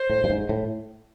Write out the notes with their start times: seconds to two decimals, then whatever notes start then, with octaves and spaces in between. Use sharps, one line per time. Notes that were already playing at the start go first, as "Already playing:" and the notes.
Already playing: C5
0.10 A2
0.24 G2
0.30 G#2
0.49 A2